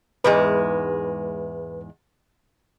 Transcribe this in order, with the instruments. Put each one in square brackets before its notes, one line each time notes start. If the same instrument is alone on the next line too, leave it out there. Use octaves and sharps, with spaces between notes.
[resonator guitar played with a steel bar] E2 G#2 G#3 [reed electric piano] B4